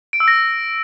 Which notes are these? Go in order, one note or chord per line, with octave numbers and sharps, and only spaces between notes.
D7
E6
A#6